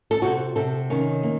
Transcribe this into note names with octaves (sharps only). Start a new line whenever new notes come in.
A4
C3 F#4
C3 A4
D#3 C#4
A#3